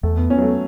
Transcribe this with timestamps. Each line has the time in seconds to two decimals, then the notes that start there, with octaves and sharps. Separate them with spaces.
0.03 E2 A3
0.17 B3
0.30 B3 C#4
0.38 F#3
0.42 A3